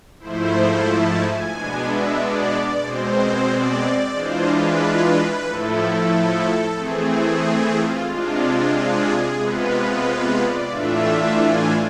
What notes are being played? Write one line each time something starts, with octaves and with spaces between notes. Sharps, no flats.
G#2 F3 A3 E4 C5
A5
G#5
B2 G#3 B3 D4
E5
D5
B2 G#3 C4 C5
D5
E3 G#3 D4 F4 C5
B4
A2 F3 A3 E4 A4
A4
E3 A3 C4 G#4
G#4
F4
C3 G#3 D4 F4
G#4
C3 G#3 B3 F4 B4
D5
A2 E3 A3 D4 F4 E5
G#5